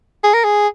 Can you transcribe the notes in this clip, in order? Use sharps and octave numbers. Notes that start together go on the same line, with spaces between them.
G#4
A#4
G#4